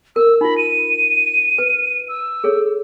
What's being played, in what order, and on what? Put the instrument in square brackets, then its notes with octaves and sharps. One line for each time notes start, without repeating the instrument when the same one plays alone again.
[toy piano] A#4 [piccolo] E6
[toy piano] D#4 F4 [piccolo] B5
[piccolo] D#7
[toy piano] B4
[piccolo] E6
[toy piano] G#4 A4 C#5